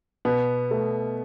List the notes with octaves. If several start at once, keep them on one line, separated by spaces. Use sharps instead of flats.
B2 B3
A3